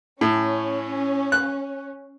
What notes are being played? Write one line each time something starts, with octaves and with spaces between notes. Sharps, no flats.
A2 C#4
F#6